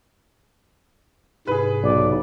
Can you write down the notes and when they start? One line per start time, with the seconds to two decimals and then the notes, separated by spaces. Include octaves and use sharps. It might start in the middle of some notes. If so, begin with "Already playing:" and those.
1.47 G#2 C3 E4 G#4 B4
1.83 B1 D5